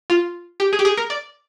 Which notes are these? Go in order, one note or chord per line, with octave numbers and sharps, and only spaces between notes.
F4
G4
G#4
G4
G#4
A#4
D5